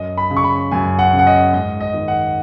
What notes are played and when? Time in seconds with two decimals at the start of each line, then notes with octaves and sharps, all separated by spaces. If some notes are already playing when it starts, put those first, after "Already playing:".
Already playing: F#2 D#5
0.17 B5
0.30 C#3
0.36 C#6
0.44 B5
0.71 F#2 G#5
0.99 F#5
1.13 C#3
1.19 F#5
1.27 D#5
1.53 G#2 D#5
1.80 D#5
1.94 D#3
2.08 F#5